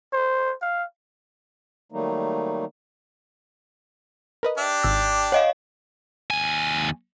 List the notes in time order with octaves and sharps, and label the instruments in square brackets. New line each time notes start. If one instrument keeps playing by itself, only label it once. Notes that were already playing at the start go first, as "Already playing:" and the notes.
[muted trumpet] C5
F5
[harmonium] D#3 F#3 G3 A3 A#3 D#4
[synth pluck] A#4 B4 D#5
[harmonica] D4 G4 [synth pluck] E5
[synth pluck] G#1 E6 A#6
[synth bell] C#5 D#5 F5 [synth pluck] F#5
[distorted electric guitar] D#2 G#5